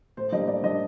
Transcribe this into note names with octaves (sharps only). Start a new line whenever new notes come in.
A2 C5
G3 A#3 D4 D#5
A2 D5
G3 A#3 D4 D#5